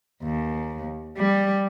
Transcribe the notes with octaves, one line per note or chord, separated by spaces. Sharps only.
D#2
G3